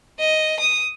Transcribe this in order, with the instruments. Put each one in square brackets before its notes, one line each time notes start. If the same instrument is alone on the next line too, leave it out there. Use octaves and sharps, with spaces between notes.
[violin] D#5
D#6